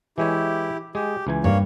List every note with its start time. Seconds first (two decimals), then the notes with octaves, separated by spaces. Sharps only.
0.18 E3 G#3 E4 G4 C#5
0.95 G#3 G4 G#4
1.27 C#2 E3 G#5
1.44 G2 A#3 C#5